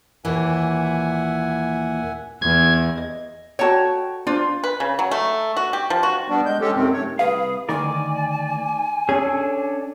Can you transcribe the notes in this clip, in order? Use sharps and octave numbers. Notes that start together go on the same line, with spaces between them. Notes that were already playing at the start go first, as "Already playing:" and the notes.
D#2 A#2 E3 E5 F#5 G#5
E2 G#6
D#5
F#4 A4 C#5 G5 A5
D4 F4 C5 D5
B4
C#3
F#3
A3
F#4
G4
F3
F#4
G3 B3 D4
G#3 G6
G#3 C#4 G4 A4
F#2 C3 D#3 C4
A3 C#5
C2 G#4 B4 F5
D2 D#3 A#4 D5 G#5
C#4 D4 G#4 A4